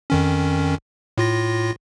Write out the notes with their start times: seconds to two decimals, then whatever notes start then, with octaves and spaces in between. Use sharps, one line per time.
0.10 F2 D#3 C#4
1.18 A2 F4 A#6